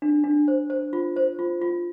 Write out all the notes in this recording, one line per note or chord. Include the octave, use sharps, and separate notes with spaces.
D4
D4
C5
C5
F4
C5
F4
F4